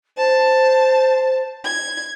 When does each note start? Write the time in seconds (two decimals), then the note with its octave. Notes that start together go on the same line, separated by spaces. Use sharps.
0.17 C5 A5
1.65 G#6